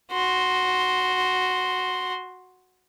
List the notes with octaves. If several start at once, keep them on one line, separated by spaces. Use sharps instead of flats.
F#4 C6